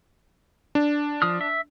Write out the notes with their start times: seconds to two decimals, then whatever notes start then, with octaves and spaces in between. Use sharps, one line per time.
0.75 D4
1.22 F3 D#6 F6
1.41 E5